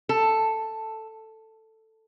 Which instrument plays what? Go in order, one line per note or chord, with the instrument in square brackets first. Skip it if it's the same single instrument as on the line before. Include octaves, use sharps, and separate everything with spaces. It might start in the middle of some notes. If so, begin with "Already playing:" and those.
[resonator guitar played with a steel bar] A4